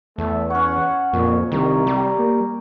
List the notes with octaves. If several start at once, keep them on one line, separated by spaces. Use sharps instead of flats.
E2 A3
C#4 C#5 F#5
F2 A#2
C2 D#3 A#5
G3 G4
A#3